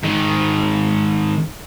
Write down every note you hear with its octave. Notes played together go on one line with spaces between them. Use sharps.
G#2 D#3